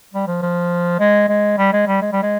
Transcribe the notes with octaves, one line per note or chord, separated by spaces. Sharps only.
G3
F3
F3
G#3
G#3
G3
G#3
G3
G#3
G3
G#3